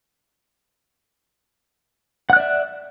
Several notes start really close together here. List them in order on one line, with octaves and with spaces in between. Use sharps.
F#5 F#6 D5 E5